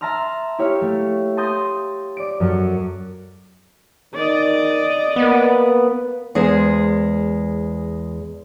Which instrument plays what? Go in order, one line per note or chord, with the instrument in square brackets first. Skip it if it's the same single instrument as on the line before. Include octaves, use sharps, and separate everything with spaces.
[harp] E5 A5 A#5 C6 F6
E4 G4 C#5 F5
A3
A5 C6 D#6 G6 A#6
D5 D7
F#2 F#3 A4 C#7
[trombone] D#3 [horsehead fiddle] D5 D#5
[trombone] A#3 [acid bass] B3
[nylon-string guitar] E2 G#3 G#4 C5